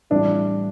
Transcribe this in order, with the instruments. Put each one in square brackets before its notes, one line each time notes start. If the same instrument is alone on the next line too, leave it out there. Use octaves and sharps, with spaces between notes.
[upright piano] A2 E3 G3 C4 [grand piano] D4